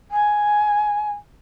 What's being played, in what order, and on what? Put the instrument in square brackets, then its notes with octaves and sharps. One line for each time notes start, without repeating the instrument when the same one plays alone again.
[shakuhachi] G#5